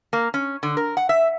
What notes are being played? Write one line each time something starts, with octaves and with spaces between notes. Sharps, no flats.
A#3
C#4
D3
A#4
F#5
E5